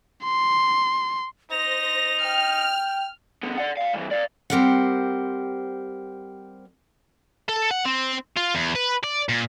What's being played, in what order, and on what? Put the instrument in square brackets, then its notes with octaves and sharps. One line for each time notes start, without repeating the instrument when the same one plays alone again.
[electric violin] C6
[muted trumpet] D#4 [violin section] C5 A#6 [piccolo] F7
[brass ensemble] G5 [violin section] F6
[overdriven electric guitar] B2 D3
D5 F#5
D5 F5
G2 E3
D5 F5
[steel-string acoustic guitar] G3 C4 G4 A#4 C5 F#5
[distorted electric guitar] A4
F#5
C4
F4
E2
B4
D5
A#2